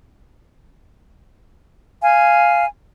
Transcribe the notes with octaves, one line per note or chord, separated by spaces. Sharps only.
F5 G#5